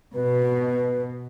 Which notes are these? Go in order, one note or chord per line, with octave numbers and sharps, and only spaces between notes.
B2 B4